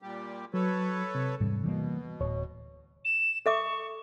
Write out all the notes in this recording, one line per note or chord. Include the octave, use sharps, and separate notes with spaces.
A#2 G3 G4
F#3 A4 B4 C#5
C3
E2 G#2 C3 G3
B2 E3 G3 A#3
D1 C#5
E7
A4 E5 C#6 D6